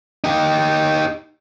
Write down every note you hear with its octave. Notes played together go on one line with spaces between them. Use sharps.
D#4 G4